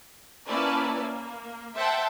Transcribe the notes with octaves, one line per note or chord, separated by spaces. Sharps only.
A#3 C#4 E4 B4 D5 A5
A#3
C5 E5 F#5 G5 A5